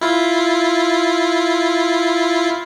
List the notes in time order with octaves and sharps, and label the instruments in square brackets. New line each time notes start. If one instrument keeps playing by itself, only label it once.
[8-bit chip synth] E4 F4